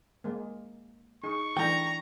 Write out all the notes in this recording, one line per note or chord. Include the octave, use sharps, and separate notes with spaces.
G#3 A#3
D#4 G#4 C#6
E3 A3 D4 G5 A#5